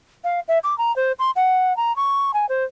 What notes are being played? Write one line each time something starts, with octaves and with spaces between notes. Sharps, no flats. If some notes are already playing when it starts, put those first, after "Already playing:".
F5
E5
D6
A#5
C5
C6
F#5
A#5
C#6
G#5
C5